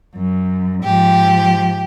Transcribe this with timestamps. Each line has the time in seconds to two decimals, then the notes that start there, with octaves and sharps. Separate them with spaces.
0.15 F#2
0.84 G#2 F3 G4